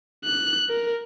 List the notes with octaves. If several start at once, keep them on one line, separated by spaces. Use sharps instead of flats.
F#6
A#4